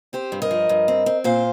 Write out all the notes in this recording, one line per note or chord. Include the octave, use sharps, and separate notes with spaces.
C4 G4 C5
G2
A#4 D#5
F3
G2
C4
C4
A#2 C5 F5